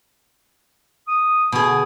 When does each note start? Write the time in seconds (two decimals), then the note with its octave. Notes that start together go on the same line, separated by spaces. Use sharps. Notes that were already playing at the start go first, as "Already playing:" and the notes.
1.08 D#6
1.52 B2 D3 G#4